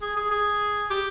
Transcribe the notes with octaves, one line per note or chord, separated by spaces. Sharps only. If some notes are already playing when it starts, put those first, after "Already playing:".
G#4
G#4
G#4
G4